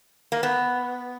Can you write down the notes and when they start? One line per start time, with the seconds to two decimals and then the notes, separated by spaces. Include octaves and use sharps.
0.32 A#3
0.43 B3